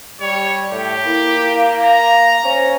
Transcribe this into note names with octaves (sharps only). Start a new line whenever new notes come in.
G3 C#5
A2 G4
A#3 E4
F5
A#5
C#4 C5